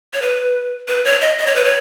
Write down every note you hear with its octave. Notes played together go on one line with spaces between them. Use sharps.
C#5
B4
B4
C#5
D#5
D#5
C#5
B4
C#5